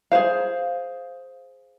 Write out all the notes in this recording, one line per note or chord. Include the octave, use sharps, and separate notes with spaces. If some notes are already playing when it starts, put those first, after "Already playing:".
G#4 C5 F5